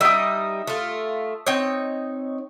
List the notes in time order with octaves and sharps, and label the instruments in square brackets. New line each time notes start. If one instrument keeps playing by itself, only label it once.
[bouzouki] G3 D#4 [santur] E5 D#6
[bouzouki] A3 F4
C4 D#4 C#5